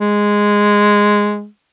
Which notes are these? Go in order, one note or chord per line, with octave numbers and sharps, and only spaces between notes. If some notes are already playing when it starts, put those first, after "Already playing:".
G#3